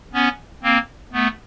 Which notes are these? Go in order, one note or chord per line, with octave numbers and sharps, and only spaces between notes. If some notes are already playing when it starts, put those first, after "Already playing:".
B3 C#4
A#3 C4
A3 B3